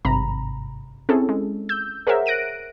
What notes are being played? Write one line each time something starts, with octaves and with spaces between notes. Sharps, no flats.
G#1 G2 C3 A#5 B5
C4 C#4 E4 G#4 A4
G#3
E6 G6
G#4 A#4 C5 C#5 E5 F#5
F#6 A#6 D7 D#7